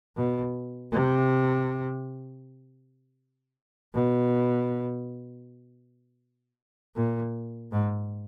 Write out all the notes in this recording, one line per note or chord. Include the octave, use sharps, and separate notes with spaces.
B2
C3
B2
A#2
G#2